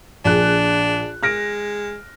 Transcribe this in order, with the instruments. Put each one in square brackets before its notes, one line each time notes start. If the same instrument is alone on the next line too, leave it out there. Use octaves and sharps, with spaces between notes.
[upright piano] A#1 G#4 F#6 [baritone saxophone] D4
[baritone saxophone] G#3 [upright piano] F6 A#6 D7